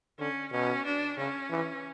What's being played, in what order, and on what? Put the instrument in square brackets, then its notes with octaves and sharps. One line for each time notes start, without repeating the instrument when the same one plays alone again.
[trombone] D3 [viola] C#4
[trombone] B2 [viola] C#4
[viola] D4
[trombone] C#3 [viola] C#4
[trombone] E3